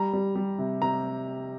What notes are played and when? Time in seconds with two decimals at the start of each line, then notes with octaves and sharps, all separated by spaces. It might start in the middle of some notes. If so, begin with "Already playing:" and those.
Already playing: G3 A#5
0.13 G3
0.35 G3
0.59 C3
0.82 C3 A#5